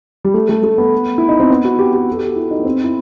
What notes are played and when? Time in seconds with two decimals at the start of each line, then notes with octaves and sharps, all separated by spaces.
0.24 G3
0.34 A3
0.49 A3
0.63 A3
0.78 B3
1.18 E4
1.29 D#4
1.40 C4
1.50 B3
1.65 F#4
1.79 G4
1.93 G4
2.12 A4
2.17 G4
2.27 F#4
2.36 E4
2.51 D#4
2.59 B3
2.65 C4
2.84 E4